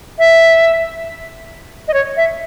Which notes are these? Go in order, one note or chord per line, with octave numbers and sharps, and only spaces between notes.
E5
D#5
C#5
E5